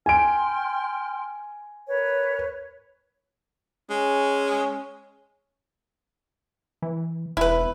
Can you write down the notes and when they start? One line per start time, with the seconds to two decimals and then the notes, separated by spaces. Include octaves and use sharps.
0.06 G5 G#5 C6 F6 D7
1.89 A#4 B4 C#5
3.90 G#3 C#4
6.82 E3
7.37 E1 E4 B4